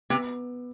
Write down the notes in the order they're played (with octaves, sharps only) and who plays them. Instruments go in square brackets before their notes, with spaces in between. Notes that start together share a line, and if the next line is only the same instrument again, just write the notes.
[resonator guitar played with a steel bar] C3 [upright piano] B3